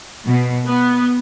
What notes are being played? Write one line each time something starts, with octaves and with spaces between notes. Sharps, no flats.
B2
B3